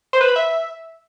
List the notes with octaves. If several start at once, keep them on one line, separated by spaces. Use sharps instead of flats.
C5
B4
B5
E5